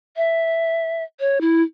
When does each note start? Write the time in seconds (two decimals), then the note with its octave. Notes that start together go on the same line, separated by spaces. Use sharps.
0.17 E5
1.20 C#5
1.41 E4